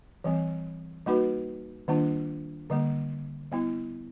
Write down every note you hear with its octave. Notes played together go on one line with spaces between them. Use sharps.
E3 G3 C4
G3 A#3 D#4 F#4 B4
D#3 G3 A#3 D4 F4
D3 G3 A#3
G3 B3 E4